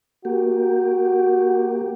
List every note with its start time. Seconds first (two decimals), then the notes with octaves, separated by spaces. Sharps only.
0.25 A#3 F#4 G4